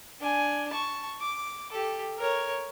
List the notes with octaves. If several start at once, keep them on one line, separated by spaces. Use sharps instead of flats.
D4 G#5
A5 C#6
D6
G4 A4
A#4 C#5